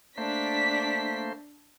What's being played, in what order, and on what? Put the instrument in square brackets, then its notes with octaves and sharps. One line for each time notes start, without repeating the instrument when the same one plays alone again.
[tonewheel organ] A3 A#3 C5 [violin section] D4 B6